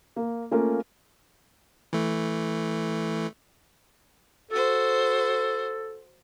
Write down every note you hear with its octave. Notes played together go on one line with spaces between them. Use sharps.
A#3
A3 A#3 C#4 F4 A#4
E3 A3
F#4 A4 C5